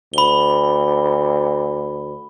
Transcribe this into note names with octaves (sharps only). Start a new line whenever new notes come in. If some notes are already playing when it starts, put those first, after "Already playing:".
D2 B5 G7